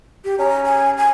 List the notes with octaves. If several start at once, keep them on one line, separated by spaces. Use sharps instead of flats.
G4
C#4 A#5
G#5
G#5